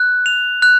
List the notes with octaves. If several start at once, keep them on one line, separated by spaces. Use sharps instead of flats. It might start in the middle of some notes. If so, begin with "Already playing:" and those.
Already playing: F#6
F7
F#6